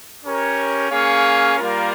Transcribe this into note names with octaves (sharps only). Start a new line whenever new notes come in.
C#4 G4 A#4 C#5
A#3 C#4 G#4 C#5 F5
G3 A#3 F4 A#4